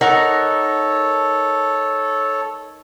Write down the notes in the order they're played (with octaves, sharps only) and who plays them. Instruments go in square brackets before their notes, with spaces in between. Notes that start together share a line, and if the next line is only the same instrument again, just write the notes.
[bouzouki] D#4 A#4 F#5 [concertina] A4 C#5